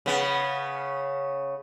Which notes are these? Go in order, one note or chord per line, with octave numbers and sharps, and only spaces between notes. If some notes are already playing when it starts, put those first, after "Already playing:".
C#3 B3